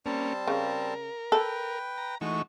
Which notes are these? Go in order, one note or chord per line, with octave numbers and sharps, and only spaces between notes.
G3 A#3 C4 C#4 A5
C#3 A#4
A4 B4 G5
A#5
E3 G#3 A3 D#4 F#4 C#6